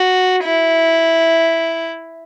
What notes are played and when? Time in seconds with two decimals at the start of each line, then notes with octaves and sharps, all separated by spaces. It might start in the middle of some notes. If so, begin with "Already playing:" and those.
Already playing: F#4
0.44 E4